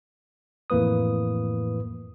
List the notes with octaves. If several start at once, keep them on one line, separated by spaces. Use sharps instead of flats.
F2 A2 E3 A#3 B4 D#6